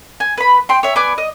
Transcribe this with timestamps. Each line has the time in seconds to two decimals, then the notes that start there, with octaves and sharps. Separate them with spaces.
0.20 G#5
0.37 B4 B5
0.69 G5 C6
0.83 C#5 E5
0.96 B3 D5 G#5 D6
1.18 D#5